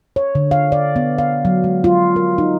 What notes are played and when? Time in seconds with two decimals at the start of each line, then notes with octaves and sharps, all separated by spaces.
0.16 C#5
0.35 D3
0.51 F5
0.72 D5
0.96 B3
1.18 F5
1.45 F#3
1.64 G#3
1.84 F4
2.16 A#4
2.38 D#4